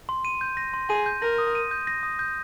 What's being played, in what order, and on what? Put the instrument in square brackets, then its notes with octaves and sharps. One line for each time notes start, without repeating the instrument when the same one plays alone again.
[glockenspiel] C6
D#7
G6
A#6
C6
[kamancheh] G#4 [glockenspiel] D#7
[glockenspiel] G6
[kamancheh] A#4 [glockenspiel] A#6
[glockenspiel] D#6
D#7
G6
A#6
D#6
G6